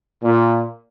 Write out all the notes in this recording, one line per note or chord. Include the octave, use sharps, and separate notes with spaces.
A#2